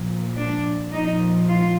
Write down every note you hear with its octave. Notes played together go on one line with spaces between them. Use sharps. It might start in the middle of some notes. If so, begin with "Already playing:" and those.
Already playing: A#2 F3
D4
A#2 F3 D#4
F4